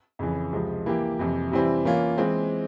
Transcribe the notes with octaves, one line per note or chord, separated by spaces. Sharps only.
F2 C#3 E3
C#2 C3 F3 G#3
E3 A#3 E4 G4
F2 C3 E3
C3 E3 G3 C4 E4
E3 A#3 C#4 F4
E3 G#3 C4